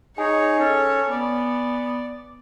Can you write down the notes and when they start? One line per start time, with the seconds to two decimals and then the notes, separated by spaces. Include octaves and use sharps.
0.18 D#4 G#4 C#5 G#5
0.59 C#4 A4
1.11 B3 D5